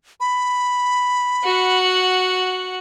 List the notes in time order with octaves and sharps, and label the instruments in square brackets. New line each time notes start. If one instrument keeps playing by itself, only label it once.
[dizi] B5
[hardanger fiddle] F#4 F#5